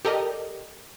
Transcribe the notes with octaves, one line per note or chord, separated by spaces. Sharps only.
G4 A4 A#4 D5 D#5